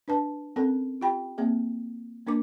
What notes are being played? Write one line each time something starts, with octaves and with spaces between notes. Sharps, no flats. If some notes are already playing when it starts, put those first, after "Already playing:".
D4 B4 A5
C4 C#4 A4 A#4
F4 G4 G5 B5
A#3 C4 G#4 E5
A#3 D4 A#4 D6